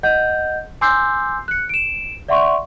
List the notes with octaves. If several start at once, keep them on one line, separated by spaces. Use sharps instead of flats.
D#5 F#5 G6
G#5 C6 D6 E6 G6 C7
F#6 C#7
D7 E7
D5 E5 F#5 C6 C#6